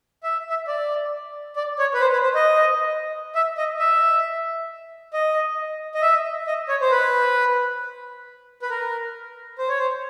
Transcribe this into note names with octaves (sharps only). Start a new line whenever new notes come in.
E5
E5
D5
D5
C#5
B4
C5
B4
C5
D#5
E5
D#5
E5
D#5
D#5
E5
D#5
C#5
C5
B4
B4
A#4
C5
C#5
C5